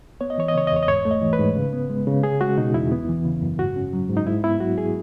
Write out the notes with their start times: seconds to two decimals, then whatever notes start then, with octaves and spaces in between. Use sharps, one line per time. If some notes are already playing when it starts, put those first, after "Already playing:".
0.21 B3 C#5
0.30 D#5
0.38 E3 C#5
0.48 D#5
0.55 C#3 C#5
0.67 D#5
0.72 E2 C#5
0.83 D#5
0.88 G#2 C#5
1.05 A3
1.11 D#5
1.22 E3
1.33 B4
1.39 G#2
1.56 C#3
1.73 B3
1.90 G#3
2.07 C#3
2.23 C#4 G#4
2.41 G#3 F#4
2.58 B2 D#4
2.74 E2 E4
2.92 B3
3.09 E3
3.25 C#3
3.42 F#2
3.59 G#2 F#4
3.76 C#4
3.93 F#3
4.10 G#2
4.17 D#4
4.26 G#2 E4
4.44 B3 E4
4.60 F#3 F#4
4.78 G#4